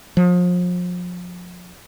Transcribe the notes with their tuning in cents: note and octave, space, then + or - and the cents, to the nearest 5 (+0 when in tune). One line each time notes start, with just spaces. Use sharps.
F3 +35